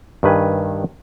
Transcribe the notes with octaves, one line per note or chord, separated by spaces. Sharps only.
G2 D#3 B4 G#5